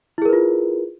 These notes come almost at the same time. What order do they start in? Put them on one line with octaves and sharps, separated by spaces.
E4 G#4 A#4 B4 F4